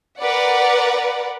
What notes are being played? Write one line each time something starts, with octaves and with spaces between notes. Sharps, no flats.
A#4 B4 D5 F#5